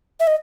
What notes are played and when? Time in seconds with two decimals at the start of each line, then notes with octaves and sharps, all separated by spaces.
0.20 E5
0.27 D#5